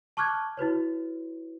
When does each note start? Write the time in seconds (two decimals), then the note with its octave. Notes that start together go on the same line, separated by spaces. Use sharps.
0.17 A5 C#6 D6 F6 F#6 G#6
0.57 E4 F#4 B4 C#5